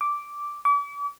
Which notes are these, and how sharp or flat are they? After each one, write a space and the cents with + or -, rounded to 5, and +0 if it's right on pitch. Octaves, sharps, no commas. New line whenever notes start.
D6 -5
D6 -40